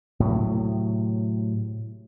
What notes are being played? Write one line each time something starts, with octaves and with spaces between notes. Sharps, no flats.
A2 C3 F#3